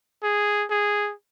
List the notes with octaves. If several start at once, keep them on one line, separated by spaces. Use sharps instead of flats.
G#4
G#4